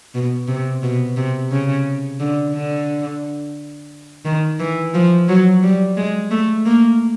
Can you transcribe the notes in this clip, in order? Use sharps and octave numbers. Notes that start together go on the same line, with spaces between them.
B2
C3
B2
C3
C#3
D3
D3
D#3
E3
F3
F#3
G3
G#3
A3
A#3